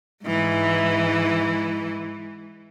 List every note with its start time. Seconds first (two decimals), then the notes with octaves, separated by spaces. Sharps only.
0.24 G#2 E3